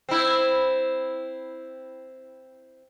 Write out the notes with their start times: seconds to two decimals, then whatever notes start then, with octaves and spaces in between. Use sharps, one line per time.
0.09 C4 E4